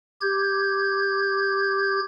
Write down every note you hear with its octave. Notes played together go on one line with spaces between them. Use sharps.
G4 G6 G#6